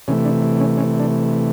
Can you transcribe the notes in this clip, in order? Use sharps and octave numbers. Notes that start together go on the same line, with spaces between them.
C3 E3 A3 C#4
D4
C#4
C#4
D4